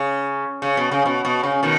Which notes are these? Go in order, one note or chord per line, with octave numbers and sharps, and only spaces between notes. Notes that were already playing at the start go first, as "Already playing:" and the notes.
Already playing: C#3
C#3
B2
C#3
B2
B2
C#3
B2 D#3